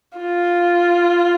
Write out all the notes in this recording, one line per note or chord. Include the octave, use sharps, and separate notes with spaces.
F4